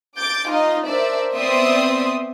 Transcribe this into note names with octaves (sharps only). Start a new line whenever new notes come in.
D6 G6 A6
D#4 F4 D#5 F5
D4 A#4 C5 D5 E5
B3 C4 D5 E5 C6 D#6